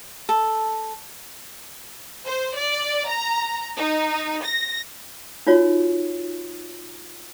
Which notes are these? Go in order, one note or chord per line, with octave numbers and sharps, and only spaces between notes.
A4
C5
D5
A#5
D#4
A#6
D#4 F4 F#4 C#5